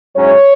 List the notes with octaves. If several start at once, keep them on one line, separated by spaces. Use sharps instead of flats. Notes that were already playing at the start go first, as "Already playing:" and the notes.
G#2 F#3 C#4 E4 C#5